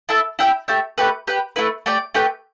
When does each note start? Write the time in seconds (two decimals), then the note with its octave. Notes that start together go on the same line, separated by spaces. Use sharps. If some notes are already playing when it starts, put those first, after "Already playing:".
0.09 E4 A4 E5 A5
0.39 E4 G4 E5 G5
0.68 A3 G4 E5 G5
0.98 A3 G4 B4
1.27 G4 B4 G5
1.56 A3 E4 B4
1.86 A3 G4 D5 G5
2.14 A3 G4 B4 G5